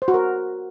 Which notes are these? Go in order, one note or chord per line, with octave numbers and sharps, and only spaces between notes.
C5
F#4
A#4